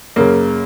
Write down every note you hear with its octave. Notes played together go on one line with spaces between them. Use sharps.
F#2 C#3 A#3